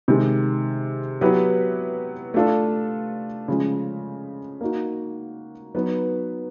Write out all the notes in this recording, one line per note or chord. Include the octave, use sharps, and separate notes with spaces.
C3 D#3 G#3
F#3 B3 E4 G4 B4
A3 D4 F4 A4
C#3 F3 G#3
A#3 D#4 F#4
F#3 B3 D#4 F#4 B4